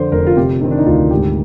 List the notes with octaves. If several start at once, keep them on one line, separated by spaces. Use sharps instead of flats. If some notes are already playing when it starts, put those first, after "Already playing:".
Already playing: F2 D3 C5 D5
F1 A#4
F4
C3 G4
D#3 C4
D4
D#4
D2 F4
G#2 G4